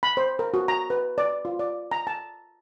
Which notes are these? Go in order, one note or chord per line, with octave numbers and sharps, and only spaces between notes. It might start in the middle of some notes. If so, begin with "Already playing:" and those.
B5
C5
A#4
F#4
A#5
B4
D5
F4
D5
A#5
A5